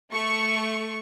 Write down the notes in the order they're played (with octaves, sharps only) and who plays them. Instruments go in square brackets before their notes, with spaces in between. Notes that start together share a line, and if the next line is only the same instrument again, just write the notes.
[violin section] A3 C#6